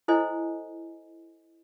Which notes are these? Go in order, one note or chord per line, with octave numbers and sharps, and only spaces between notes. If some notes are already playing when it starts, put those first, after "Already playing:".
E4 A4 C5 D#5 G#5